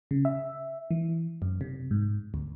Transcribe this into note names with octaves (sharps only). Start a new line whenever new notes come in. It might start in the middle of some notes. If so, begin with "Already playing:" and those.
C#3
E5
E3
F#2
C3
G#2
D2